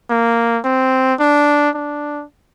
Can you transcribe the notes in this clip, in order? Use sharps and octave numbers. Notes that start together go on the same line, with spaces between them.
A#3
C4
D4
D4